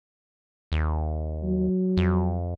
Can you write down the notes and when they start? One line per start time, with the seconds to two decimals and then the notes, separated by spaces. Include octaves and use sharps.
0.72 D#2
1.44 F#3
1.97 F2